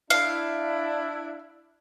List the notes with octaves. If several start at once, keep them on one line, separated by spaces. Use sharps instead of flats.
D4 E4 F5